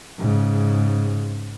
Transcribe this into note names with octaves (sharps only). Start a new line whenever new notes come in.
G#2 C#3